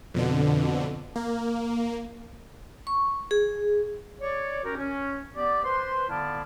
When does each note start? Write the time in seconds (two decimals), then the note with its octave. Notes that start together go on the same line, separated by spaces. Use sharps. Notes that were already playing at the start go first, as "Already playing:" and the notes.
0.14 F2 B2 D3
1.16 A#3
2.87 C#6
3.31 G#4
4.21 C#5 D5
4.63 C#4 F#4 G4 A#4
4.77 C#4
5.35 B3 G4 D5
5.64 B4 C5 C6
6.09 D3 B3 E4 D5 F5 A5